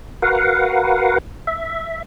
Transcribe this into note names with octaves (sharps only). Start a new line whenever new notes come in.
F#4 A#4 B4 F5 F#5
E5